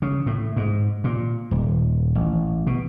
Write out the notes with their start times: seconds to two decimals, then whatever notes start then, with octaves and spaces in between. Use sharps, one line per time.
0.02 C#3
0.26 A2
0.57 G#2
1.04 A#2
1.51 D#1
2.15 A1
2.67 B2